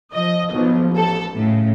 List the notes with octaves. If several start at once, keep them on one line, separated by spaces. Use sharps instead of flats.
F3 D#5
B1 F3
A1 A4
A2 C#3